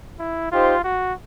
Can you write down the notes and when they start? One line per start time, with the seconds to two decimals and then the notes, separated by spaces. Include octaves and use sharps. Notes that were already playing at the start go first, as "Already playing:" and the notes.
0.19 E4
0.52 D#4 F4 G4 C5
0.84 F#4